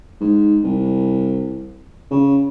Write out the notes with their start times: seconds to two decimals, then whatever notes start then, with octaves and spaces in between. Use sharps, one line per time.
0.21 G#2
0.64 C2
2.11 C#3